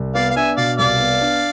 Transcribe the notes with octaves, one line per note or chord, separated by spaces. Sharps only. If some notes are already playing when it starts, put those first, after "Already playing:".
Already playing: C2
B3 D5 F5
F5
D4 E5 G#5
B2 D5 F5
C2 D5 F5
B3
D4